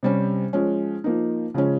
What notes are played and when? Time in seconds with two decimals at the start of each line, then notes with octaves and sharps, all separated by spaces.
0.03 C3 G3 C#4
0.53 F3 G#3 C#4
1.04 F3 A#3 D#4
1.54 C#3 F3 G#3 C#4